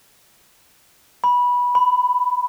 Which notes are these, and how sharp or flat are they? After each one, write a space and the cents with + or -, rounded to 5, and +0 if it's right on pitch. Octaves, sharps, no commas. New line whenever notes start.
B5 -15
B5 +15